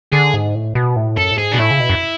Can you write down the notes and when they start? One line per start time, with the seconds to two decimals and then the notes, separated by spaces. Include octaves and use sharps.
0.13 D3 G#4
0.34 G#2
0.55 A2
0.75 B2
0.96 A2
1.17 F#2 A4
1.31 A2
1.38 G#2 G#4
1.52 B2 D4
1.58 A2 E4
1.71 C#3
1.80 B2
1.89 F#2